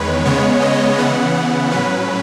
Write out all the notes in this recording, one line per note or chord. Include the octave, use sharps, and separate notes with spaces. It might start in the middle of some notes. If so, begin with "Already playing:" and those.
Already playing: E2 D#3 G#3 B4 C#5
C#3 G#3 B3 C#5
D#5
C#3 E3 B3 F#5
F#5
A2 F#3 C#4 B4